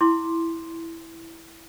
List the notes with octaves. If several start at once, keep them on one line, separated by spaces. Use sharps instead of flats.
E4 C6 D6